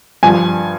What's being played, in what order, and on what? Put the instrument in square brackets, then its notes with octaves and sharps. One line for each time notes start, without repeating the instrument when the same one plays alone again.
[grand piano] G2 F3 G#5